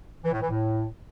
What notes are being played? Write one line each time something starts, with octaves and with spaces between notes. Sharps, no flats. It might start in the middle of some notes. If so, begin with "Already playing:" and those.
E3
A2
E3
A2